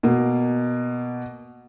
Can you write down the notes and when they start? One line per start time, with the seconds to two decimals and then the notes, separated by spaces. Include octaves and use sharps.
0.03 B2 A#3